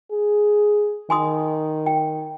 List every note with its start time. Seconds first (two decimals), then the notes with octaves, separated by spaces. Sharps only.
0.11 G#4
1.10 D#3 G#5 C6 D#6
1.86 G5